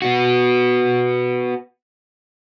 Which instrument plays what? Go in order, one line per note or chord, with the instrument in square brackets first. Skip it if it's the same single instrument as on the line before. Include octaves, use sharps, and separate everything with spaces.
[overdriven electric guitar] B3 F#4